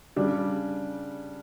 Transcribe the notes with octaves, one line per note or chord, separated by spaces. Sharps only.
C#3 G3 D4